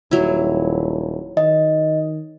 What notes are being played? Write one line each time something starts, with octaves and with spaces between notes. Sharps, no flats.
D#1 F#3 E4
D#3 D#5